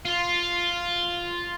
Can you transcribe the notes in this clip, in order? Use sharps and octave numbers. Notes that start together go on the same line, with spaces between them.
F4